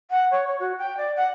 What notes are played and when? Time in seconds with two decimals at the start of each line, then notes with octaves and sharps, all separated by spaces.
0.10 F#5
0.31 C#5
0.47 C#5
0.60 F#4
0.78 G5
0.97 D5
1.16 F#5